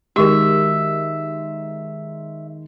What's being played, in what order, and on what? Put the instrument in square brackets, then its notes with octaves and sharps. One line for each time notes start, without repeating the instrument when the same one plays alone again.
[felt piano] D#3 G#3 [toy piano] F#4 G4 A#4 [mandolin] E5